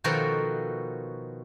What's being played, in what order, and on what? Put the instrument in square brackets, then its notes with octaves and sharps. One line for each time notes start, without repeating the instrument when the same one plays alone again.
[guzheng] B2 D#3 F3 F#4 A4 A#4